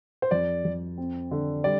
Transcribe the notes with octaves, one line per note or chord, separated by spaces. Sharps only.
C5
F2 D5
F2
C4
D3
G3 D5